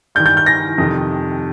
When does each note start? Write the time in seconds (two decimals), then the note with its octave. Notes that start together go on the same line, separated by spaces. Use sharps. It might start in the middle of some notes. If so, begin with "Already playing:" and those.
0.15 G2 G6
0.20 D#3
0.26 G6
0.37 G6
0.46 A#6
0.78 F2 C3 D#3